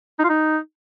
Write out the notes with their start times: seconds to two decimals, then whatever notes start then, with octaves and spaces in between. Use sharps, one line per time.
0.19 D#4
0.24 F4
0.29 D#4